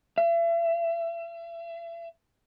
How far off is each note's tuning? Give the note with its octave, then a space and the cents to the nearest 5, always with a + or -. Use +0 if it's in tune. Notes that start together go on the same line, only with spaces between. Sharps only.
E5 +40